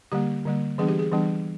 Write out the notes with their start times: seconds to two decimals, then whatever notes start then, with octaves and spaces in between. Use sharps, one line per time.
0.12 D3 G3 A#3 G4
0.45 D3 G3 A#3
0.78 E3 G3 B3 D4 G#4
0.88 G4
0.99 G#4
1.12 E3 G3 B3 D4